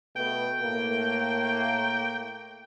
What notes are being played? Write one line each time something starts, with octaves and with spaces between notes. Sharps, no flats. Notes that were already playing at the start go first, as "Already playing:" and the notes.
B2 A3 B4 G5
A2 A3 A#3